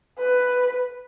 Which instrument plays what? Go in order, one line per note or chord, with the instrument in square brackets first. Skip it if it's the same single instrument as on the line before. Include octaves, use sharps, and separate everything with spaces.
[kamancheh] B4